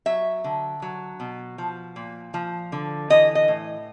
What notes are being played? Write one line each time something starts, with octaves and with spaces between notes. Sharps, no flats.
F#3 E5
D3
F#3
B2
F3
A#2
F3
D3
E3 D#5
D#5
A2